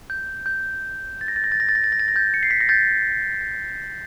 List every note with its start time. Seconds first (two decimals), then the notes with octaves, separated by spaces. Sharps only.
0.10 G6
0.46 G6
1.21 A6
1.28 A#6
1.36 A6
1.44 A#6
1.52 A6
1.60 A#6
1.69 A6
1.75 A#6
1.84 A6
1.92 A#6
2.00 A6
2.08 A#6
2.16 G6 A6
2.34 C#7
2.43 C7
2.51 B6
2.61 A#6
2.69 G6 A6